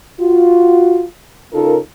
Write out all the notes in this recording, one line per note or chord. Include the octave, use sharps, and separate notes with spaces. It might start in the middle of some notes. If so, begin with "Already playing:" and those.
F4 F#4
C#3 D#4 F4 A4 A#4